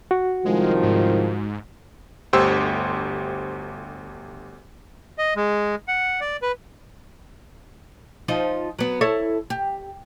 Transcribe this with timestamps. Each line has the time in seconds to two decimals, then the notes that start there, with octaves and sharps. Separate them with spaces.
0.11 F#4
0.45 C2 D#3 F3 G#3
0.83 G#2
2.33 G1 D2 G4 C5 E6
5.18 D#5
5.36 G#3
5.88 F#5
6.21 D5
6.42 B4
8.28 F3 D#4 F4
8.79 F#3 B3
9.01 E4 A4 C#5
9.50 G4